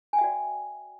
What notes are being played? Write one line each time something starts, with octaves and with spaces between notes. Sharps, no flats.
F#4 D5 E5 G5 G#5